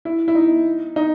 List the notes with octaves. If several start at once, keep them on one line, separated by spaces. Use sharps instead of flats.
E4
E4
D#4
D#4